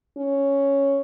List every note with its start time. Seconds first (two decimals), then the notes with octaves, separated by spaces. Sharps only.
0.17 C#4